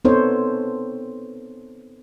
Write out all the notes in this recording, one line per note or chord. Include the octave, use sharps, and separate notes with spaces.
B3 C4 D#4 A4 C5 C#5